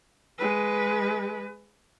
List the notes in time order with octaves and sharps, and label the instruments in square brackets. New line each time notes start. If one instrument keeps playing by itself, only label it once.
[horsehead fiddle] G#3 B4